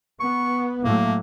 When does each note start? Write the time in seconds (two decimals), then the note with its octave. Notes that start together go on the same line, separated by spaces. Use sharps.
0.20 B3 C#6
0.85 A2 F#3 A3 A#3